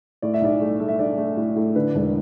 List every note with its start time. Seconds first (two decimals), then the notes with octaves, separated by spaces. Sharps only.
0.22 A2 D5
0.34 E5
0.42 B1 D5
0.61 A3
0.80 A3
0.88 E5
0.99 D4 D5
1.18 A3
1.37 A2
1.56 A2
1.75 D3 B4
1.95 E1